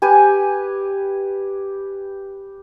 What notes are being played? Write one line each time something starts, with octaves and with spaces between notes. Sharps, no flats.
G4 B4 G#5